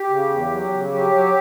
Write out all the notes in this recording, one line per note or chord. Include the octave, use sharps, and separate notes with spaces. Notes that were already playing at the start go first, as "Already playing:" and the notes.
Already playing: G4
C#3
E2
F#3
C#3
F#3 G4
F#3